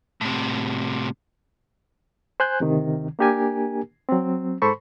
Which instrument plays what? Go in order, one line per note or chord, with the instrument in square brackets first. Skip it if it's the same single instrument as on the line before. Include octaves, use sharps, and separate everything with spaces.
[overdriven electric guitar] A2 C3
[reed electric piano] C5 G#5 F#6 G6
D2 C3 D#3
A#3 D4 G4 A#4 G#5
F#3 C4
G#2 A4 C5 B5 C#6